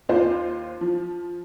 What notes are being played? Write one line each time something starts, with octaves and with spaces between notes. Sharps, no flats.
D#2 F4 C5
F3